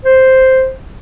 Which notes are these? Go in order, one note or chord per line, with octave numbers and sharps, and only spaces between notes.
C5